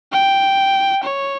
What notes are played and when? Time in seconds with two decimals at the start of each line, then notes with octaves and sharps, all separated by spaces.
0.12 G5
1.03 C#5